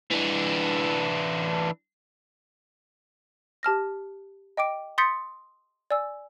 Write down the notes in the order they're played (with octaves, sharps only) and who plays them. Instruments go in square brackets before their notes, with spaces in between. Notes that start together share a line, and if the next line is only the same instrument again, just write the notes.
[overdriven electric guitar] E3 D4
[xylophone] G4 A5 F6 A#6
D#5 G5 D6 D7
C6 D#6 G6 A6 B6 C#7
D5 G#5 E6